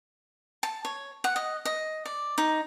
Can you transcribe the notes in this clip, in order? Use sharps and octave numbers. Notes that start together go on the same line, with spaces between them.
A5
C#5
F#5
D#5
D#5
D5
D#4